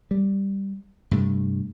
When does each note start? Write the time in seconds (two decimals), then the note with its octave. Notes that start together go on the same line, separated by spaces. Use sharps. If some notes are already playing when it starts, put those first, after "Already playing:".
0.11 G3
1.11 G2 C3 A3